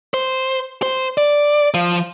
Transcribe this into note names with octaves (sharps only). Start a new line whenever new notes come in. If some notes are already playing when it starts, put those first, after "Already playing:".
C5
C5
D5
F3